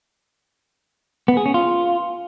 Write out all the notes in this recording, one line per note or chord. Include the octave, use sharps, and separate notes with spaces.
B3
G#4
C#4
F4